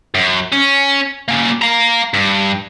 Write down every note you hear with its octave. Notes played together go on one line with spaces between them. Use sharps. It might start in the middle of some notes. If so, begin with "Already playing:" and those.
F#2
C#4
A#3 C#4
F5 A#5
G2